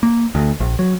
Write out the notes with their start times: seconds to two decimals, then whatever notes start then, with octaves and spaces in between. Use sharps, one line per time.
0.03 A#3
0.35 D2
0.60 A#1
0.79 F#3